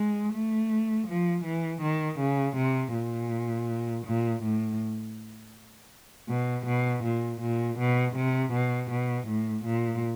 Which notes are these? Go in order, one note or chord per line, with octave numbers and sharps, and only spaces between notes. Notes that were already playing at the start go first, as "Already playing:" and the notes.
Already playing: G#3
A3
F3
E3
D#3
C#3
C3
A#2
A#2
A2
B2
B2
A#2
A#2
B2
C3
B2
B2
A2
A#2